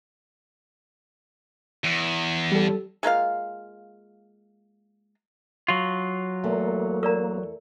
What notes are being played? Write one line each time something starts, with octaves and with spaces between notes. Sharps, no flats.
E2
G3 A4
G#3 A#3 F4 F5
F#3 F4
E2 A3 A#3
A#4 D5 A#5